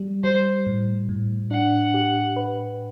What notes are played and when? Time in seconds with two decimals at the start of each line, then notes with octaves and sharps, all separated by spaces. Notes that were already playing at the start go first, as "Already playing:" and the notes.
Already playing: G3
0.23 G3 C5
0.67 A2
1.09 A2
1.51 D4 F#5
1.94 G4
2.36 B4